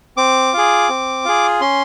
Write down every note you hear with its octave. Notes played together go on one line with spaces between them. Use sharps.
C4 D6
F4 G#4
C4
F4 G#4
C#4 C6